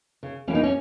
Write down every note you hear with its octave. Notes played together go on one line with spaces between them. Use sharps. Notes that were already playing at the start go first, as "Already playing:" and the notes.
C#3
E3 A#3 C#4
D#4
C#4